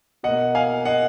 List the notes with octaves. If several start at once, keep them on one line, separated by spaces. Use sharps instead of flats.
B2 A#3 D#5 F#5
F5 G#5
D#5 F#5